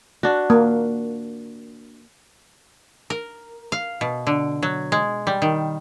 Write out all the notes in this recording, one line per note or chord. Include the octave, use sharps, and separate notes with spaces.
D4 F#4
A#3
A#4
F5
B2
D3
F#3
G#3
G3
D#3